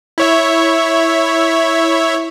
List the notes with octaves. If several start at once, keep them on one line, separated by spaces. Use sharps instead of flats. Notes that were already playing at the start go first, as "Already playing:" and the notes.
E4 C#5 E5